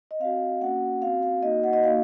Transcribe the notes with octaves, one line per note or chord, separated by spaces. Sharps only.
D#5
C4 F#4 F5
A#3 C#4 F#4 F#5
C4 F#4 F5
F5
A#3 D#4 F#4 D#5
F#5
D#5
A#3 D#4 F#4 F5